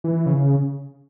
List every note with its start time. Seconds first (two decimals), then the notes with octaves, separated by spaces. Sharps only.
0.04 E3
0.15 E3
0.26 C#3